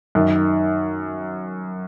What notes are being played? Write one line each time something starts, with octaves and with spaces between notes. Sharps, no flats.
F#2 D#3